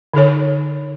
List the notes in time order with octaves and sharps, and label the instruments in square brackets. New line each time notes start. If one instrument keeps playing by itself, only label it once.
[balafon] D3 D#4 A4 C#5